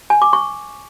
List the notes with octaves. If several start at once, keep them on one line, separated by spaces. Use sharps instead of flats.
G#5
D6
C#6